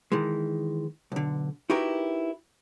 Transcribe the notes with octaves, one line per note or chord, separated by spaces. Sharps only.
D#3 E3 G#3
B1 D3
D#4 E4 F#4 G4 A#4 B4